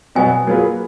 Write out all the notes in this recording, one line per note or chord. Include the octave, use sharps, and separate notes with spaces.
B2 F#3 B3 F#4 G#5
F#3 A#3 F4 G#4 B4